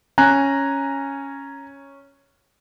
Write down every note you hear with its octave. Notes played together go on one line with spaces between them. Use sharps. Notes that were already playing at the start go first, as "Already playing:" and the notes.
C#4 G#5 A#5 F#6